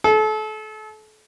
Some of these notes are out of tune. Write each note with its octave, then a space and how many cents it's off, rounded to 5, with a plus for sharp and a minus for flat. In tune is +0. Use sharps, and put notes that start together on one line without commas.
A4 -35